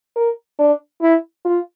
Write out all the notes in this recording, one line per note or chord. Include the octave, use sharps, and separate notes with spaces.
A#4
D4
E4
F4